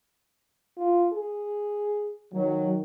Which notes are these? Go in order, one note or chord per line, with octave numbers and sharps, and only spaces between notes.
F4
G#4
D#3 F#3